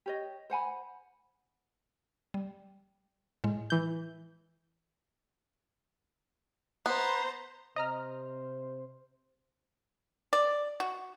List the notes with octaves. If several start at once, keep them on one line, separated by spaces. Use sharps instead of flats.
G4 C#5 D#5
C5 F#5 G#5 B5
G3
A2 G#3
E3 G6
B3 C5 A#5
C3 C5 D#5 A#5 F6
D5
F#4